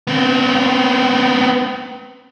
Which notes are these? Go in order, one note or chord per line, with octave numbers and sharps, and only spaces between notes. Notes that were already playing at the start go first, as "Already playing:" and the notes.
B3 C4